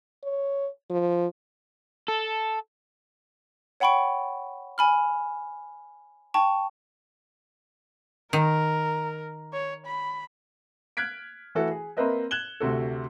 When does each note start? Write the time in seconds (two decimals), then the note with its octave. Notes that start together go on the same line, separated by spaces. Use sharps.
0.24 C#5
0.90 F3
2.08 A4
3.80 C#5 F#5 G5 B5 C#6 D7
4.78 G#5 B5 F6
6.34 G5 A5 C#6
8.33 D#3 A#4
9.53 C#5
9.86 B5
10.97 F6 F#6 G#6 B6 D7
11.55 E3 A3 E4 F#4 A4
11.71 G#4
11.97 A#3 C4 A#4 B4 D#5 E5
12.31 F#6 G#6 E7 F#7 G7
12.60 D2 C3 F#4 A4